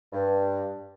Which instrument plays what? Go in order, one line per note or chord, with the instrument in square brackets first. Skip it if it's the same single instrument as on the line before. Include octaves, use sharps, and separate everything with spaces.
[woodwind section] G2